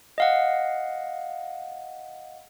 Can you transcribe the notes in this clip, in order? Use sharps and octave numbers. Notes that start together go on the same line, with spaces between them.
D#5 F5 F#5